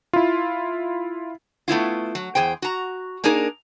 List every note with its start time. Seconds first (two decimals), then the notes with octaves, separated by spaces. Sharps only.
0.13 E4 F4
1.68 A3 B3 E4 F4
2.15 F#3
2.35 E2 G#4 C5 G5
2.62 F#4 A#5
3.24 A#3 D4 D#4 G#4 A#4